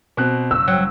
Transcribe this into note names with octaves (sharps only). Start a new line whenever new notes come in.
B2 C4 F#6
F#1 E6
F#3